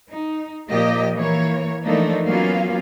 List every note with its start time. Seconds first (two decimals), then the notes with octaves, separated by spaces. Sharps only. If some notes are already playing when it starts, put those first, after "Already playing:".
0.10 D#4
0.69 A#2 F3 A#3 G4 D#5
1.16 E3 A#3 C#5
1.84 E3 F3 A3 A#3 D4 D#4
2.25 F#3 A#3 B3 C#4 F4 F5